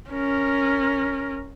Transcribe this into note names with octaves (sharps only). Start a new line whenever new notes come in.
C#4 A#4